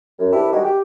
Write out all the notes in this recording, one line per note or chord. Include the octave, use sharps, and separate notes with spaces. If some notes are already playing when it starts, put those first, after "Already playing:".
F#2
C2 D4 E4 G4 B4 A5
D#3 G3 G#3 D#4 F#4
G4